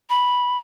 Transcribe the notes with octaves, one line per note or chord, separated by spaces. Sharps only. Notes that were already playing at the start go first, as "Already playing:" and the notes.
B5